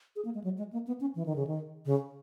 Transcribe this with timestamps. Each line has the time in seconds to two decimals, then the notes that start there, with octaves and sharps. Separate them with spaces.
0.16 G#4
0.25 A#3
0.34 G#3
0.44 F#3
0.58 G#3
0.73 A#3
0.87 B3
1.01 C#4
1.15 E3
1.26 D#3
1.36 C#3
1.47 D#3
1.85 C#3